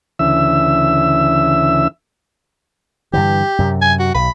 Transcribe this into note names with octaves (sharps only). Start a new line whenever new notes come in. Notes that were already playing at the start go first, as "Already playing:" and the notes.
D2 C#3 E3 E5 E6
G2 D3 E3 G4
F#2 C3
G#5
F#4
B1 B5